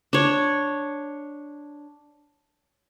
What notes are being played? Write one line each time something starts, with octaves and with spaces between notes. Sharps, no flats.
D4 C#5